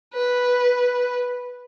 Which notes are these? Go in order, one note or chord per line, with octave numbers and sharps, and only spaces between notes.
B4